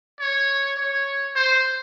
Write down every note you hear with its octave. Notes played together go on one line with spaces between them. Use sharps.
C#5
C#5
C5